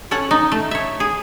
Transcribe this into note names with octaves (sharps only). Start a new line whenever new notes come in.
C#4 A4 C#5 F#5
D#4
A3
C#5 E5
G#4